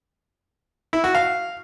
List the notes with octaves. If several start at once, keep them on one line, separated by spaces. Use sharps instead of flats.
E4
F#4
F5